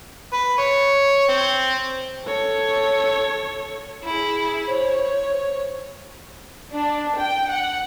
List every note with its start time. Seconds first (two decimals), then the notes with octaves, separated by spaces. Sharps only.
0.33 B4
0.58 C#5
1.29 C4
2.26 A4 C#5
4.04 E4 G#4
4.68 C5 C#5
6.73 D4
7.18 G5
7.50 F#5